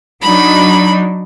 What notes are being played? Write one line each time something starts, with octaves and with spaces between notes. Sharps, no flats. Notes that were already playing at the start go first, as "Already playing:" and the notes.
F#3 D4 D#4 B5